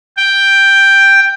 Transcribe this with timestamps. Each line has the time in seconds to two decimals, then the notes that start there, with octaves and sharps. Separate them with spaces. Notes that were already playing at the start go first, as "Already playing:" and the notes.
0.17 G5